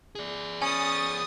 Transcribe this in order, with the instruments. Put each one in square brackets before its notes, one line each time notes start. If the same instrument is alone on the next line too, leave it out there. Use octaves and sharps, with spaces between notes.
[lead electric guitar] G#4 D5
[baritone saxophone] C#4 [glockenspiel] G#5 [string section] D#6 A6